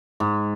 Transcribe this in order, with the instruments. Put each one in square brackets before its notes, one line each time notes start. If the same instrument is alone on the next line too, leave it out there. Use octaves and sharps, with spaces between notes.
[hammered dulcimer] G#2